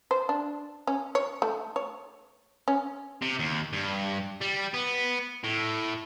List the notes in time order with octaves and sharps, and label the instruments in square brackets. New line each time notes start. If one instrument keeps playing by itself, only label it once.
[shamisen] C5
D4
C#4
C#5
A3
C#5
C#4
[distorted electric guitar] C3
D#2
G2
G3
B3
A2